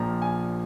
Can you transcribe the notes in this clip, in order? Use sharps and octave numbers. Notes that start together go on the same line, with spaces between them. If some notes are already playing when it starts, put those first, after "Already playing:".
Already playing: A#1 A#2 F3 A#5
G#5